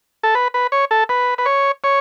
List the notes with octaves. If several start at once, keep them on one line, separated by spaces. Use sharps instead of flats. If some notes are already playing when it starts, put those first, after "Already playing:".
A4
B4
B4
C#5
A4
B4
B4
C#5
C#5